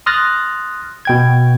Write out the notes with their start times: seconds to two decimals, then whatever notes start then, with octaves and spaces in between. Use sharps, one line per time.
0.06 C6 D#6 F6 F#6 A6 A#6
1.05 B2 G5 G#6